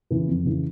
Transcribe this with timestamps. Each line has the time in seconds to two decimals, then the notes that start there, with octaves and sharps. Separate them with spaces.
0.10 C#3 E3
0.28 F2
0.45 C#3 E3